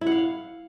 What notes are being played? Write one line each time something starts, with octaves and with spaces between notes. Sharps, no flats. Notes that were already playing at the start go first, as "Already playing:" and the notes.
E4
F#5
F5